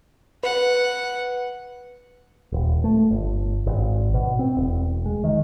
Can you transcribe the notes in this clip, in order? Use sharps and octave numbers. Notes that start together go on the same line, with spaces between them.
B4 F#5
D#1
A3
G1
G#1
B2
C4
E1
G#3
D#3